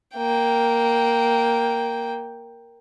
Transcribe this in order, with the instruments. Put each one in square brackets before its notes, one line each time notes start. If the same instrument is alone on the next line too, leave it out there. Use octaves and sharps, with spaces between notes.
[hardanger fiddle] A#3 G5